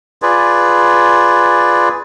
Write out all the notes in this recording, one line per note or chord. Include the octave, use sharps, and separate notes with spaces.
F4 G#4 B4 D5